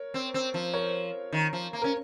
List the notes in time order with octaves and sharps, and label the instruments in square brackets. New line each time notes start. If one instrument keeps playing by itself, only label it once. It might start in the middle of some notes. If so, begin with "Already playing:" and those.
Already playing: [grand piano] A#4 C#5
[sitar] C4
C4
F3
[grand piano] A#4 C#5
[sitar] D#3
F3
A#3
[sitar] C#4 [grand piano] A#4